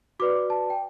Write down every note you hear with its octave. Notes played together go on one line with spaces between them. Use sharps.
F#4 B4 D5 D6
A5
G5